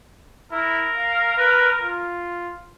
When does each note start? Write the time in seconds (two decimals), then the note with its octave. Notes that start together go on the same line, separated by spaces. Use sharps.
0.52 E4 A#4
0.97 F5
1.37 B4
1.82 F4